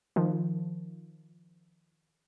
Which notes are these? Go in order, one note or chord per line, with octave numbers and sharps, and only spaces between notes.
D#3 F3